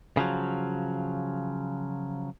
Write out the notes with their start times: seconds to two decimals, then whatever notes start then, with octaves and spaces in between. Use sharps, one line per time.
0.17 C#3 F3 F#3